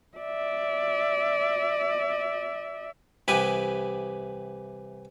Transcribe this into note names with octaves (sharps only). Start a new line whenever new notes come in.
D5 E5
C2 E3 G4 B4 G#5